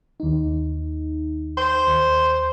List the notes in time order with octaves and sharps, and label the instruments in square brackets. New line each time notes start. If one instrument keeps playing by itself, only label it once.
[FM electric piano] D#2 D#4
[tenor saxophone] C5
[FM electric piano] D#2